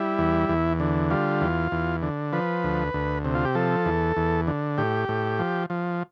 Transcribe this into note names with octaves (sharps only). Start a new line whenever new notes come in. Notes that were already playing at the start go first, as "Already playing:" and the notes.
Already playing: G3 E4
E2
E2
D3
G3 F4
E2
E2
D3
F3 B4
D2
D2
C3
F4
G4
F3 A4
E2
E2
D3
A2 G4
A2
F3
F3